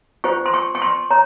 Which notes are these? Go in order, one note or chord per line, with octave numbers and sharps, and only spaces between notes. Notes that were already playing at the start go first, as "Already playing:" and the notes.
F4 C5 C#6
C6
C#6
C#6
C6
C#5 A#5